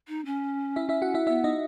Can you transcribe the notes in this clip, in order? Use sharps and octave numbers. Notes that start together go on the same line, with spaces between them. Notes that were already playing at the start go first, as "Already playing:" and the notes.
D#4
C#4
E4 E5
E4 E5
F#4 F#5
E4 E5
B3 E4 E5
D#4 D#5